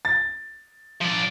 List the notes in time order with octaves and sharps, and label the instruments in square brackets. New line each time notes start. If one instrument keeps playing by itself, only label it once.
[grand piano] A6
[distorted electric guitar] F3 D5